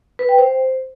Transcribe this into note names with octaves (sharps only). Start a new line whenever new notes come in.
B4
G5
C5